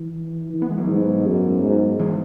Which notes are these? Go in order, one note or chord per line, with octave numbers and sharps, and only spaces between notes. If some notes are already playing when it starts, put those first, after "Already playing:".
Already playing: E3
E3
B3
G#3
F#3 B3
G#2
F#2
G#2
E3 G#3